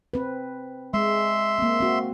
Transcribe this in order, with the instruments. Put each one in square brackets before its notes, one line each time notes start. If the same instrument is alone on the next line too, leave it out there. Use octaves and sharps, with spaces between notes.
[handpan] C4 B4
[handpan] G#3 [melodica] E5 C6
[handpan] A#3 C4
C4 F#4